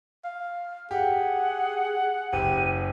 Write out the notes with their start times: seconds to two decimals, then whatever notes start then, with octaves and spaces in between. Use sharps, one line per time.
0.24 F5
0.91 G4 G#4 F#5
2.33 F#1 G4 D#7